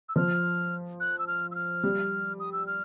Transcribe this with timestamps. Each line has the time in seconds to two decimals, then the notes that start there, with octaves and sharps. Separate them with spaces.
0.09 E6
0.16 F3 F6
1.00 F#6
1.19 E6
1.27 F6
1.51 E6
1.55 F6
1.83 G3
2.40 D#6
2.52 E6
2.67 F6